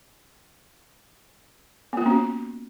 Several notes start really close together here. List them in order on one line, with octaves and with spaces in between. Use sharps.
B3 F4 A#3 C#4 F#4